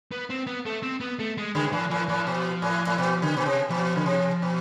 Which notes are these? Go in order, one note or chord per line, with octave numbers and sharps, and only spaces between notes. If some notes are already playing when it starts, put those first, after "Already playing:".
B3
C4
B3
A3
C4
B3
A3
G#3
D3 G#3
B2
A2 F3
A2 F3
A2 F3
B2
A2
A2
B2
D3
B2
C3
B2 F3
D3
C3
B2